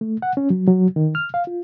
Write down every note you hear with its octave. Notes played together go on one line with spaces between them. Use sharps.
A3
F#5
C#4
F#3
F#3
D#3
F6
F5
F4